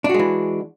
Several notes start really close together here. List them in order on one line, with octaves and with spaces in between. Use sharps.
D4 F#4 G#3 E3